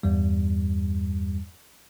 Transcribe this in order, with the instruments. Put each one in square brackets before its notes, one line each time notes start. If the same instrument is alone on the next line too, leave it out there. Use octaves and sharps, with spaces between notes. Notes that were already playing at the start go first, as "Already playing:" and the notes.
[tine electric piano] E2 G2 G3